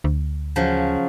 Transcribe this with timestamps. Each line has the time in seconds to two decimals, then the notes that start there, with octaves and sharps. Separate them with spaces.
0.04 D2
0.56 C#3 F3 F#3